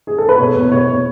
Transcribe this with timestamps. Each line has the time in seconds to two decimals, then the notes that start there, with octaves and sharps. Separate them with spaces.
0.07 G#4
0.18 A4
0.29 B4
0.38 B2 C#5
0.55 E2
0.71 B2 C#5